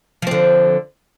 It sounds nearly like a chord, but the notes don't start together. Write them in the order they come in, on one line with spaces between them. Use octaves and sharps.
F3 C4 D3